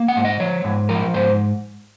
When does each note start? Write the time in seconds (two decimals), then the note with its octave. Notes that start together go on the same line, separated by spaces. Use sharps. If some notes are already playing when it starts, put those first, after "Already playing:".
Already playing: A#3
0.08 F#5
0.17 G#2
0.25 D#5
0.40 F3 C#5
0.64 G#2
0.89 F3 A#4
1.14 G#2 C5